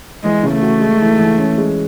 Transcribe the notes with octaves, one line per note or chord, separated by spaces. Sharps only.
E3 G#3
C#3
A3
F#4
G#3
E3
E3
C#4
G#3